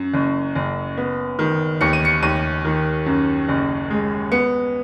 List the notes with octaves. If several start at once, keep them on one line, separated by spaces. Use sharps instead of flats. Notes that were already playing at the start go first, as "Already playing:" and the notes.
Already playing: F#2
F#1
F#1
B3
D#3
D#2 C#7
D#7
C#7
D#2 D#7
D#3
F#2
F#1
G#3
B3 C#7